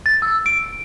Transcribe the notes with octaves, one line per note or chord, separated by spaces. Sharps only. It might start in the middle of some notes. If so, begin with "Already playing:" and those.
A6
E6
D7